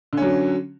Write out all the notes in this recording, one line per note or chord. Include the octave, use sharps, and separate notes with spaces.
D3 F#3 C#4